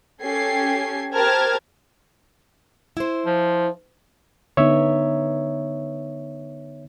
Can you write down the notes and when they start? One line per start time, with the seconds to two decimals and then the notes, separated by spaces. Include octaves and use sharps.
0.23 C#4 G4 A4 G#6 C7
1.13 G4 A#4 C5 A5 F6 G#6
2.97 E4 C5
3.26 F3
4.57 D3 B3 D#4 C#5 E5